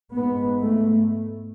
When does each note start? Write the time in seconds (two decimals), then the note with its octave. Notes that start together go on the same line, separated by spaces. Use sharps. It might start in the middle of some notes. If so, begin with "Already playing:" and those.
0.14 G#2 B3
0.61 A3